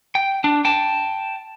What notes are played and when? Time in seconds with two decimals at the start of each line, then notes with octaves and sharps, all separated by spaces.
0.15 G5
0.44 D4
0.65 G5 A5